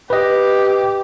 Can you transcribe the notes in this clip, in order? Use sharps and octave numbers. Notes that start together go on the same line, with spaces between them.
G4 B4 D#5